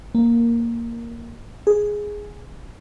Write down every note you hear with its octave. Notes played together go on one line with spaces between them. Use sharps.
A#3
G#4